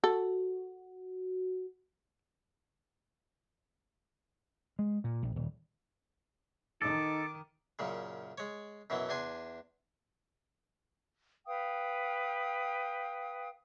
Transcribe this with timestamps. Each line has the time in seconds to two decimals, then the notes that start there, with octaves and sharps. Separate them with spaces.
0.04 F#4 A4
4.79 G#3
5.04 A#2
5.23 A#1
5.36 D#1
6.82 D#3 D#4 A4 D6
7.79 F#2 A#2 C#3
8.38 G#3 C#5
8.90 F#2 B2 E3 F#3
9.09 E2 D4 G#5 C6
11.46 B4 F5 G5 D#6